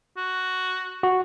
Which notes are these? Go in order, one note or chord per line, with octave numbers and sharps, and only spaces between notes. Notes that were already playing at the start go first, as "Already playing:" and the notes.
F#4
F#4